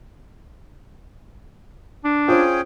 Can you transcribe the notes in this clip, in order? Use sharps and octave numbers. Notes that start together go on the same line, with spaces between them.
D4
C#4 F4 G#4 C5 G5